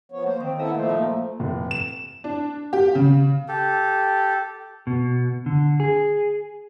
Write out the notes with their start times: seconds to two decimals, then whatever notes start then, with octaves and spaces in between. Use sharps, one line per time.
0.12 F3 B3 C#5
0.26 A#3 C5
0.40 D#3 C4
0.59 B3 E4 A4 D#5 E5 E6
0.75 A#2 F3 A3 C5
0.89 A#3 D#4
1.40 F1
1.71 E7
2.24 D4
2.73 G4
2.95 C#3
3.48 G4 A4
4.87 B2
5.46 D3
5.80 G#4